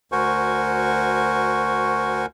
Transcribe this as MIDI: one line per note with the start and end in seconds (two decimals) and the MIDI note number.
0.12 2.26 38
0.12 2.26 66
0.12 2.26 70
0.12 2.26 72
0.12 2.26 80
0.12 2.26 85